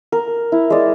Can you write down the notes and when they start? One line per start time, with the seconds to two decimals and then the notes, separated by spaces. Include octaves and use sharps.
0.12 A#4
0.52 E4
0.70 G#3 D5